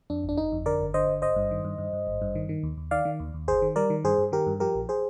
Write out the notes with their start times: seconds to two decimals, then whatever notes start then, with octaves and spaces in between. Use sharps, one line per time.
0.10 F2 D4
0.23 G1
0.29 D4
0.37 G1 D#4
0.52 F2
0.66 D3 A#4 D5
0.80 G1
0.94 D3 C5 D#5
1.08 G1
1.22 G#1 C5 D#5
1.36 G2
1.51 D#3
1.65 G2
1.78 G2
1.93 G2
2.07 G#1
2.22 G2
2.35 D#3
2.49 D#3
2.63 D#2
2.77 D#2
2.91 D#3 D5 F5
3.05 D#3
3.20 D#2
3.34 D#2
3.48 G1 G#4 C5
3.62 D#3
3.76 G3 A#4 D5
3.90 D#3
4.04 G2 G#4 C5
4.18 G2
4.32 D#3 G4 A#4
4.47 G2
4.60 F3 G4 A#4
4.75 A#1
4.89 G#4 C5